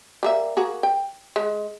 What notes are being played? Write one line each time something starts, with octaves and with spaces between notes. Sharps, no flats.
G3 A#3 E5
A#3 F#4 G#4
G5
G#3